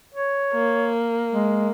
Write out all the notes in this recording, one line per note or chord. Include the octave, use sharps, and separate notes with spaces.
C#5
A#3
G#3